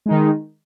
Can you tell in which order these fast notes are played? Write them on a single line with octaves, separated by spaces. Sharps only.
G#3 D#4 D#3